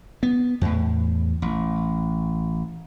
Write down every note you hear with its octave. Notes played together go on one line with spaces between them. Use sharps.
B3
E2 A2
A1